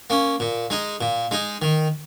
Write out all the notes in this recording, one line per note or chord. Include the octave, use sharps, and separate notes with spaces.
A#3 C#4
A#2
G#3 D#4
A#2
G#3 D#4
D#3